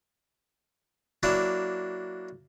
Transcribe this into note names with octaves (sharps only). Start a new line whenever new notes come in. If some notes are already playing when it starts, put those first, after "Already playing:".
F#3 A#3 D4 E4